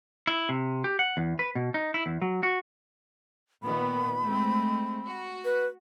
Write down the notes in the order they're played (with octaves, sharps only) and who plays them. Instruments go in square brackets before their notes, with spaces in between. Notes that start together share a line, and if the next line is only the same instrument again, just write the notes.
[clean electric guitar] E4
C3
G4
F#5
E2
B4
B2
D#4
E4
E2
F#3
F#4
[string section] A#2 D#3 B3 [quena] B5
[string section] G#3 A3 C4
F#4
[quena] B4